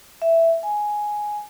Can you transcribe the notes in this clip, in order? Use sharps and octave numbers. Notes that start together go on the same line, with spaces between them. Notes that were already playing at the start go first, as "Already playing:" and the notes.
E5
G#5